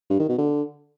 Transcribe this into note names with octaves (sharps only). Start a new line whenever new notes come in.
G2
D#3
B2
D3